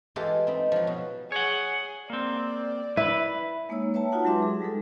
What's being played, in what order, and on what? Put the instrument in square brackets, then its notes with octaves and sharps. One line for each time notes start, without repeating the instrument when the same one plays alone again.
[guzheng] E3 G#3 F4 G4 A4
C4 D#4 B5
F3 F#3
B2
[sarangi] G#4 [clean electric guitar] C#5 F#5
[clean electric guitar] A#3 C4 [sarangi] D5
[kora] E4 [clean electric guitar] B4
[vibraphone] G#3 A#3 D#4 C#5 E6
B4 C#5 E5 G5 A5 A#5
D#4 F4 F#4 B4 F#5 A5
F#3 G#3 G4 E5 C6 D6
G#4
G3 G#3 D#4 A4